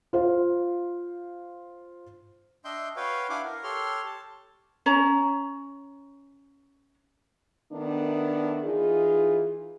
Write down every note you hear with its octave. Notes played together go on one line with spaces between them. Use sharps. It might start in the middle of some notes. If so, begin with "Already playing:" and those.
F4 C5 F5
D4 D#5 E5 G5 C6 G6
F#4 B4 C#5 F5 G5
D4 E4 F5 F#5 G#5 D6
A#4
G4 A4 C#5 C6 F6
A5
C#4 C#5 A#5
D#3 A3 B3 D4
E3 D#4 F4 G#4